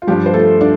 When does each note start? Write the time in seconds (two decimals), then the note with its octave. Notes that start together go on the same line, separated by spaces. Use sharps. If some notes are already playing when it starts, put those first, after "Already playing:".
0.02 F4
0.07 G2 F3 D4 G4
0.26 C5
0.34 A3 A4
0.61 D4 D5